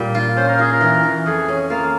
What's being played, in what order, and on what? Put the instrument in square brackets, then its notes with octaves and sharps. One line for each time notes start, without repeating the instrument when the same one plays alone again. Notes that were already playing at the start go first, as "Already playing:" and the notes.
Already playing: [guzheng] A#2 G3
F4
[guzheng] C#4 [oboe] C5
[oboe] A#4
[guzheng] F4 [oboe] G#4
[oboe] A#4
[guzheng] E3
E3
[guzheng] F2 [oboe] G#4
[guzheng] C#4
[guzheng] A#3 [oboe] F4